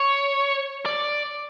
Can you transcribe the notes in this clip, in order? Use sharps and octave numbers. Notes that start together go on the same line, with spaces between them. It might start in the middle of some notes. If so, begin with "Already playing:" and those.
Already playing: C#5
D5